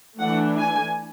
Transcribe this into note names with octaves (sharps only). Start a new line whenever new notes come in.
E3 A3 D4 F#5
G#5